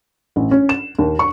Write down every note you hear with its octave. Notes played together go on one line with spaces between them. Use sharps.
A1
C#4
E7
D#2
C#6